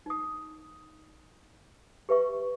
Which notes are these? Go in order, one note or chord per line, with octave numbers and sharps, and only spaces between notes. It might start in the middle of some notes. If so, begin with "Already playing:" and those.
D#4 D#6
G4 B4 E5 C#6